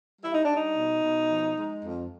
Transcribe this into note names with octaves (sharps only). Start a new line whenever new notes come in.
G3 E4
D#4
G3 D4
D#4
B2
B2
F3
G#3
F2